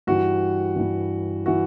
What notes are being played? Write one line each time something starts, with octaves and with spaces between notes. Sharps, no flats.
G2 E3 F#4
G2 E3
E3 F#4